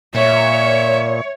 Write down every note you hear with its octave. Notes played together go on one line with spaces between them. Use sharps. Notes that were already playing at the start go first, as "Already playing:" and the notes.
A#2 C#5 E5